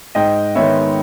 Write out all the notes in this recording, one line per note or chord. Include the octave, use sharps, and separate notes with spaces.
G#2 D#5 G5
D#3 G#3 B3 C#5 E5